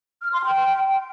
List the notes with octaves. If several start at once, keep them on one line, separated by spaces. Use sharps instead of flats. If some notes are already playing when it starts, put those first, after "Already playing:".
F6
C6
G5